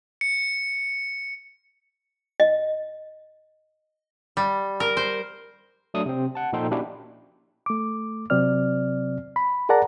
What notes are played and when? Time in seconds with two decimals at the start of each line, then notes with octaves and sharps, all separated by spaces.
0.21 C#7
2.40 D#5
4.37 G3
4.80 A#4
4.97 C5
5.94 F#3 A3 D4 D#6
6.06 C3 C4
6.35 F#5 A5
6.53 A#2 F3 D#4 A4 G5 C6
6.71 A#3 C#4 D4 E4 F#4 G4
7.66 A3 D6
8.30 C3 F#3 C4 D5 F6
9.36 B5
9.69 G#4 A#4 D5 F#5 A5 A#5